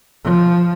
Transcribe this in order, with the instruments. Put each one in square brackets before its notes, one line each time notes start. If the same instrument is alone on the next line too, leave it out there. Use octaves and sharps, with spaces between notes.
[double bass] F3